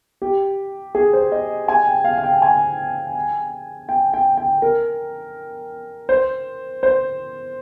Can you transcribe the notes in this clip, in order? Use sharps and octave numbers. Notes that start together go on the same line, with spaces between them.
G4
G#4
C5
D#5
G#5
G5
F5
F5
G5
G#5
G5
G5
G5
A#4
C5
C5